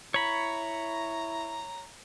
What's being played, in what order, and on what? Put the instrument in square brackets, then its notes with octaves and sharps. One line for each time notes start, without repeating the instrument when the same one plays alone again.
[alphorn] E4 [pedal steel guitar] C#5 B5 [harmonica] A#5